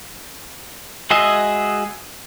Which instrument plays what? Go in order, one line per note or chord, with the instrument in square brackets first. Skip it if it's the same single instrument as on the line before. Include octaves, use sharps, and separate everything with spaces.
[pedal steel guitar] G#3 F#4 G#4 D#5 E5